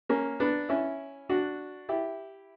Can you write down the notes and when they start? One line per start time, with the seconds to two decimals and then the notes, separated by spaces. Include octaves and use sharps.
0.09 A#3 C#4
0.40 B3 D4
0.69 C#4 E4
1.29 D4 F#4
1.89 E4 G4